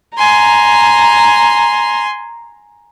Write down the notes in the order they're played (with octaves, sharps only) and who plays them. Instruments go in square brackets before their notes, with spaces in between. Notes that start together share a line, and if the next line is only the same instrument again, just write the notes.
[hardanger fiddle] G#5 C6 [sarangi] A#5